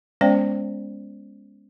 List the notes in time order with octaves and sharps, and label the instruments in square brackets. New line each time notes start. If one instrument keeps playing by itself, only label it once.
[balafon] G#3 B3 C#4 C5 D5 G5